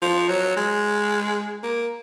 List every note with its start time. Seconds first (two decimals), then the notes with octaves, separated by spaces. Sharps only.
0.02 F3
0.28 F#3
0.57 G#3
1.63 A#3